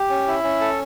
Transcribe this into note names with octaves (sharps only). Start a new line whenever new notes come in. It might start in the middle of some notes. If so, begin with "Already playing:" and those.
Already playing: G4
C#4
E4
C#4
A4